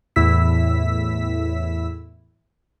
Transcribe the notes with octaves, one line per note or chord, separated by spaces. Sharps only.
E2 A2 E4 E6 B6